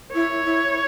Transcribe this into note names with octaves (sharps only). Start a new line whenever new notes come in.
E4 C#5
E4